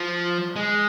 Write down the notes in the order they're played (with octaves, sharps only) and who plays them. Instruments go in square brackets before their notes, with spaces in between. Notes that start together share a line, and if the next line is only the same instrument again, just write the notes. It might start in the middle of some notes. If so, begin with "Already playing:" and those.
Already playing: [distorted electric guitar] F3
G#3